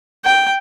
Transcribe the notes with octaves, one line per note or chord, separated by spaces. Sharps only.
G5